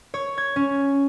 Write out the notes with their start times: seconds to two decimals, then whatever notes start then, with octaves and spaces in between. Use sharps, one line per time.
0.14 C#5
0.38 G#6
0.56 C#4